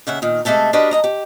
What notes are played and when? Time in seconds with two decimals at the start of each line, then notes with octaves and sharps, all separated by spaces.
0.07 D#2 C#3 E5 F#5
0.22 A#2 D#3
0.45 C3 G#3 A3 A4 A5
0.73 D4 F#4 G4 A#4 B4 D#5
0.91 D#2 D#5 A#5
1.04 G4